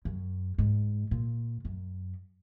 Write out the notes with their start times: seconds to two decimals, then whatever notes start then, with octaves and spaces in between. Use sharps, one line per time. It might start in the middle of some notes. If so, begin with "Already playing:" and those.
0.05 F#2
0.58 G#2
1.11 A#2
1.65 F#2